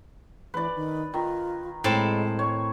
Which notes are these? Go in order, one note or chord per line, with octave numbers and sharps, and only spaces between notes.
E3 B4 D5
D#3
D#3 F4
A2 G#3 C4 A5
C#5